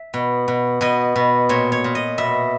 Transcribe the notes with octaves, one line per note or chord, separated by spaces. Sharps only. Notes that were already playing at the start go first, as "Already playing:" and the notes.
Already playing: E5
B2
B2
B2 D#5
B2
A#2 C#5
C#5
A#2
D#5
B2 E5